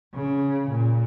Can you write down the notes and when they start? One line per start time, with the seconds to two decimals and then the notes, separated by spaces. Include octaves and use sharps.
0.14 C#3
0.70 A#2